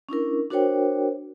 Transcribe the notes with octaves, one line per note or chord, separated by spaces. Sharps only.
C#4 D4 E4 A#4
D4 F#4 A#4 C5 C#5 G5